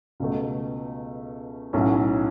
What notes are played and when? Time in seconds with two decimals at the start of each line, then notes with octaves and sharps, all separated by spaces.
0.20 C#2 B2 A3
1.73 B1 A2 F#3 C#4